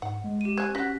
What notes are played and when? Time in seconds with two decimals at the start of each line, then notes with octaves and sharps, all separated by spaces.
0.02 G#2 F#5
0.24 G#3
0.41 G4 D#7
0.58 C4 G#5 F#6 G#6
0.75 C#4 F#4 F#5 F#6 A#6 B6